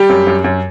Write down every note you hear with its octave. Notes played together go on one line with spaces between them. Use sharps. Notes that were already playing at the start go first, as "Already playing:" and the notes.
Already playing: G3 G4
F#2
F#2
F#2